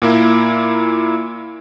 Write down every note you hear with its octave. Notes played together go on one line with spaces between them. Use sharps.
A#2 A#3 E4